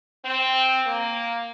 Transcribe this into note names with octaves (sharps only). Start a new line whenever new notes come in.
C4
A#3